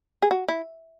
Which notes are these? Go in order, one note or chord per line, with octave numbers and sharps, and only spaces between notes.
G#4
F#4
E4